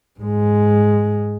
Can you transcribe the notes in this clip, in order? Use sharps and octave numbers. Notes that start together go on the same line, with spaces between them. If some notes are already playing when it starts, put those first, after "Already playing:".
G#2 G#3